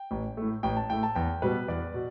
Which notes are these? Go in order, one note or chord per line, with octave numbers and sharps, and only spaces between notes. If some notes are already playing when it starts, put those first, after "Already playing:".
Already playing: G5
A1
A2 A3
A1 G5
A5
A2 A3 G5
A5
E2 G5
B2 G3 B3 B4
E2 D5
B2